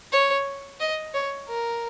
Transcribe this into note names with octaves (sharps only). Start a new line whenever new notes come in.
C#5
D#5
C#5
A#4